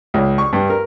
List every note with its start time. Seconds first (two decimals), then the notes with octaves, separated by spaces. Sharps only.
0.14 C#2
0.38 C#6
0.53 G2
0.70 A#4